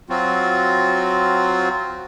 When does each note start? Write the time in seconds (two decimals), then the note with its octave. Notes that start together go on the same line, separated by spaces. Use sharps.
0.10 F#3 C4 F4 F#4